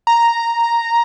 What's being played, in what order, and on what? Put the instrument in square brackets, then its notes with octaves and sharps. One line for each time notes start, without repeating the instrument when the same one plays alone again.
[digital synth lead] A#5